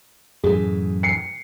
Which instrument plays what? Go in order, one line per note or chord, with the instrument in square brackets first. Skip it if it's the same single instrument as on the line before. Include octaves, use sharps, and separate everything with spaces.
[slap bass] F#2 A2 E3 [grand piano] G#4
[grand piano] C7 C#7